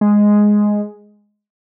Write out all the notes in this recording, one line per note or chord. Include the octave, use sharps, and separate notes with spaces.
G#3